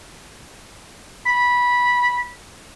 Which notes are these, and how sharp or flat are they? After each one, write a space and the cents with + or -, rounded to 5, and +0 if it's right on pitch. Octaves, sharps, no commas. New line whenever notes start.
B5 -15